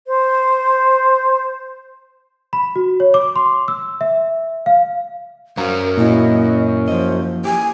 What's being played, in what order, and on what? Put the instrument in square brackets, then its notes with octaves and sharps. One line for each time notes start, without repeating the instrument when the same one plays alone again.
[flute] C5
[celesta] B5
F#4
C#5
D6
C6
E6
E5
F5
[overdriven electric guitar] F#2 [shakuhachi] A#4 [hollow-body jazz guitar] C5 F5 A#5
[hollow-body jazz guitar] A#2 [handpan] A#3 E4 F#4 [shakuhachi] D#5
[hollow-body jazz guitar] F3 D#5 [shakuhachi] C5
[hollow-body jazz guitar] G4 [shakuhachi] G#5